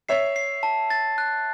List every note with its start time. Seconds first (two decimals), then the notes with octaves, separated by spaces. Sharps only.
0.09 C#5 E5 C7
0.36 C7
0.63 A5
0.90 A6
1.18 F#6